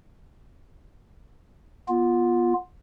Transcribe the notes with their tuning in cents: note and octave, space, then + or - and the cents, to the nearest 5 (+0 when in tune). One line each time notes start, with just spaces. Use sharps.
B3 -30 F4 +0